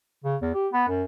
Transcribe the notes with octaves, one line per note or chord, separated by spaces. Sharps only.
C#3
E2
G4
B3
F#2